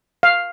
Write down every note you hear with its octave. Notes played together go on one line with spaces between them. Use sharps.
F5